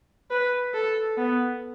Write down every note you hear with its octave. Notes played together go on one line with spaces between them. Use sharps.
B4
A4
B3